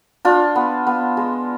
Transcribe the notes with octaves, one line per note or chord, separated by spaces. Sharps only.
D4 F4
B3
B3
G#3